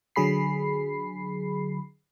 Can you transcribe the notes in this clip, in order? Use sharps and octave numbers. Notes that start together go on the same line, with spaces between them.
D3 F#3 G#4 B5 C7